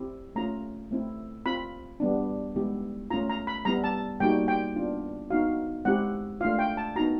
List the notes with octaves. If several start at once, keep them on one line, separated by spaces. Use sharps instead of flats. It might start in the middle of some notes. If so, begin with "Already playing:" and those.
Already playing: C4 E4 G4
A3 C#4 F4 A#5
A3 C4 E4
C4 F4 B5
G3 B3 D4
G#3 B3 E4 G4
A3 C#4 F4 A#5
A#5
B5
G3 B3 E4 A#5
A5
G3 A#3 D#4 F#4 G5
G5
B3 D4 F4
B3 D#4 F#4 F5
G#3 C4 E4 G4 F#5
A3 D4 F4 F5
G5
A5
B3 D#4 F#4 A#5